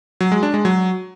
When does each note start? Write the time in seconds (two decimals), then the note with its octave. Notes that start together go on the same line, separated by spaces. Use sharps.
0.21 F#3
0.32 G#3
0.43 D4
0.54 G#3
0.65 F#3